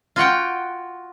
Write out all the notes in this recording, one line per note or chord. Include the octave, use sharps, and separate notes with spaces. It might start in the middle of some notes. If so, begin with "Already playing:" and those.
F4 F#4 F#5 G5